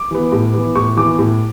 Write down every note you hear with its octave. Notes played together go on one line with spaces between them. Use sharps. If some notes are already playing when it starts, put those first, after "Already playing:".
Already playing: D6
E3 B3
A2
E3 B3
A2 C#6
E3 B3 D6
A2